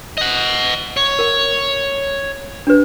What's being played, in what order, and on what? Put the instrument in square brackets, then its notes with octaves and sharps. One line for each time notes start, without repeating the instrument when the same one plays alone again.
[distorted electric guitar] D#5 F#5
C#5
[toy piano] A#4 F#5
D4 G4 B4